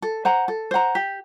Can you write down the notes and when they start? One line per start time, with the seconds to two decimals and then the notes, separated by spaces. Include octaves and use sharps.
0.02 A4
0.25 C5 F#5 A#5
0.48 A4
0.71 C5 F#5 A#5
0.95 G4